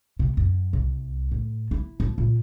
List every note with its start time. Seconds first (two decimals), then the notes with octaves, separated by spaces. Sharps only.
0.19 C3
0.37 F#2
0.73 C2
1.32 A2
1.71 E4
2.00 F3
2.18 A#2